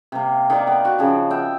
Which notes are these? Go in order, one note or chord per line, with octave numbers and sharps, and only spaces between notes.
C3 A#3
D#3 G4 D5 F5
B3 F5
F#4
C#3 F3
B3 E5 G5